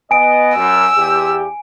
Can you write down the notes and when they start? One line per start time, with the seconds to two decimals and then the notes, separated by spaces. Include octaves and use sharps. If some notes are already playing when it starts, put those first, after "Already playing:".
0.11 B3 D#5 G#5 D7
0.56 F#2 E6
0.97 E2 G4